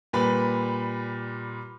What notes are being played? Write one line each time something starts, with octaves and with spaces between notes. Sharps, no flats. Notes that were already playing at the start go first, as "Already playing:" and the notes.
A#2 G3 B4 B5